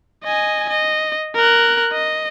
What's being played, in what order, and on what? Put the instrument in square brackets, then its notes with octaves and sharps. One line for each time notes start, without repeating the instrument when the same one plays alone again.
[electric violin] D#5 G#5
D#5
A#4 F#6
D#5